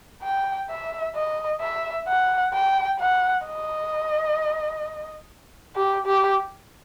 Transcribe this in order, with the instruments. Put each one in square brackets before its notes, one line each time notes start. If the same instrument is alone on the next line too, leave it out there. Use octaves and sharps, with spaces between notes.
[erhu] G5
E5
D#5
E5
F#5
G5
F#5
D#5
G4
G4